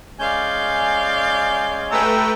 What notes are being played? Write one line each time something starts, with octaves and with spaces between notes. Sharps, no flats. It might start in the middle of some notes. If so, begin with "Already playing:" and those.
G#3 C#4 D5 F5 G#5 G6
A3 B4 G5 A#5 E6